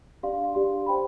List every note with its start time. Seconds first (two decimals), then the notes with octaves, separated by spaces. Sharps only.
0.23 D4 G4 D5 F5 C6
0.55 D4 G4 D5 F5 C6
0.86 C5 G5 B5